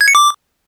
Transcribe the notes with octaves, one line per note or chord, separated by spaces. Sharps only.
G#6
C#7
D6